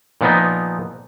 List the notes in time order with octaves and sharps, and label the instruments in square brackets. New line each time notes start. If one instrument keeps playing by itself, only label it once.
[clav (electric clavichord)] A#2 F3 B3 D#4